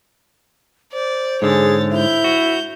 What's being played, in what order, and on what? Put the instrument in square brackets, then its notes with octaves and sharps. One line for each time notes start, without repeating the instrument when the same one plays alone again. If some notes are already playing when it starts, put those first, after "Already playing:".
[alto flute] C5 [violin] D5
[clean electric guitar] G#2 D3 [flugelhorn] G#4 [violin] C#5 A6
[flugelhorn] E4 [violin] G6 F7
[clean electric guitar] F#4